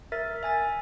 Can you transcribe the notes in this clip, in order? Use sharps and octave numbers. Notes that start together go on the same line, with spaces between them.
A#4 E5 A6
E5 G#5 A6